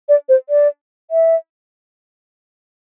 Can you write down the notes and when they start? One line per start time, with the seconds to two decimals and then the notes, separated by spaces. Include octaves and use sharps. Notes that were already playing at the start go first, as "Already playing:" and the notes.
0.09 D5
0.29 C5
0.49 D5
1.11 E5